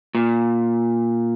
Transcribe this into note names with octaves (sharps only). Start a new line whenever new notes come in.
A#2